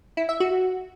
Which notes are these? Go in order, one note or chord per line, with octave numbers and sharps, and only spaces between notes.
E4
E5
F#4